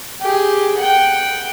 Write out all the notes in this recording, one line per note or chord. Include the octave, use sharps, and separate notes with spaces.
G4 G#4
F#5 G5